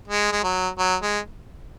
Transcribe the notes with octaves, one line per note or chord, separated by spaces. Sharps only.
G#3
G#3
F#3
F#3
G#3